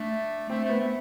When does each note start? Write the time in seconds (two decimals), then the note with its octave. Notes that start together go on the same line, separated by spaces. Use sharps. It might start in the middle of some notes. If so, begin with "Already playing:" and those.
Already playing: A3 D4
0.49 A3 C4
0.64 A3
0.69 B3
0.80 A3